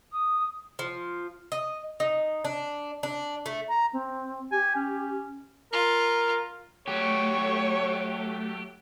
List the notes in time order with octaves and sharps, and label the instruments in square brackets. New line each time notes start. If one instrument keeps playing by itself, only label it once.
[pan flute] D#6
[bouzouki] F3
D#5
D#4
D4
D4
A3
[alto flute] A#5
C4
[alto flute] G4 [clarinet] G#5
[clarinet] C#4
[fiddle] F4 [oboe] A#4
[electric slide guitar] F#3 G4 [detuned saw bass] A3 [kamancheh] C#5